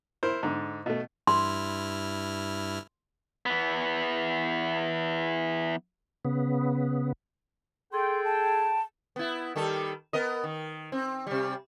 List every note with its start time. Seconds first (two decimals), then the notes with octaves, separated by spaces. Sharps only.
0.23 E4 A#4 C5
0.43 G#2 D3
0.86 B2 A3
1.27 G2 E4 C6 F6
3.46 E3 B3
6.25 C#3 B3
7.93 G#4 A4 G5 C6
8.24 A5
9.16 B3 E4
9.56 D#3 G3 A4
10.13 B3 A#4 D#5
10.44 D#3
10.92 C4
11.27 C3 G3